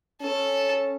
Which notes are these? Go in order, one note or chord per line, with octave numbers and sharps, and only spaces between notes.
C#4 A4